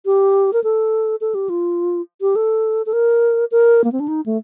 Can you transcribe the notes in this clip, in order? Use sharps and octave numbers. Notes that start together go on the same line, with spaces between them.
G4
A#4
A4
A4
G4
F4
G4
A4
A4
A#4
A#4
A#3
C4
D4
D#4
A3